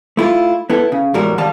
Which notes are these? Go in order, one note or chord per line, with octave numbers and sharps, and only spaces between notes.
A3 E4 F4
B3 E4 A4
C#3
E2 A2 G3 G#3 F#4 A#4
C2 D#3 G3 D#5 F5 A5